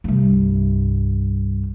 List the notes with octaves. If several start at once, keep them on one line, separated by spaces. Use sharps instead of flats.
C2 G2